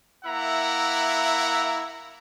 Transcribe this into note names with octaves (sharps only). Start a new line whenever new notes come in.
A#3 E4 E5 F#5 A#5